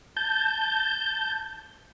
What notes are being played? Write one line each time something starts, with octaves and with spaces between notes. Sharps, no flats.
A5 G6